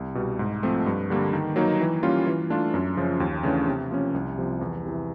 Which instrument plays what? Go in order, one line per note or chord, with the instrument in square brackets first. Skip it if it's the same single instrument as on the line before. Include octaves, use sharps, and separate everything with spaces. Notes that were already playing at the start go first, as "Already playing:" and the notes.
Already playing: [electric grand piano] C2
B2 G3
G#2
F3 A3 C4
G2
D3 G3 A#3
D#3
F#3 A#3 D#4
E3
G3 A#3 C#4 F4
E3
A3 D4 F4
F#2
C#3 F3
D#2
C#3 E3 A3 D4
C3
F3 A#3 C#4
C2
C3 F3
E2
C3 E3